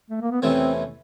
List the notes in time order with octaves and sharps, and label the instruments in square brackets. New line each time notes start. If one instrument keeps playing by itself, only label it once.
[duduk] A3
A#3
B3
[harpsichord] E2 C3 E3 A3 C#4 [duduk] C4